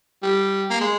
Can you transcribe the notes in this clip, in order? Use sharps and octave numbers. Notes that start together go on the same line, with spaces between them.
G3
A#3
G#3